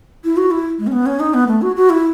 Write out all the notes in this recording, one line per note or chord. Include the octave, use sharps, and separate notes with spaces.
E4
F#4
E4
G#3
C#4
B3
C#4
D#4
B3
A3
F#4
F#4
E4